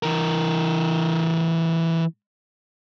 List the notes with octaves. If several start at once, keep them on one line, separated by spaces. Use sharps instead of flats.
E3 A#4